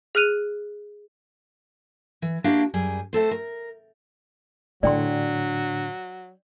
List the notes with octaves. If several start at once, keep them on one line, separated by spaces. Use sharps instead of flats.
G#4 F6 F#6 D#7 F7
E3
A#3 D4 E4 F#4 G4 F5
F#2 G3 G#4
A3 C4 A4 C5
A#4
A2 D3 F#3 D4 D5 G5 C6